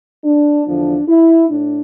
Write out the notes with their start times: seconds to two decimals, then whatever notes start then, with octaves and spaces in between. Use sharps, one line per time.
0.24 D4
0.66 E2 D3 F3 D4
1.08 E4
1.50 A2 D4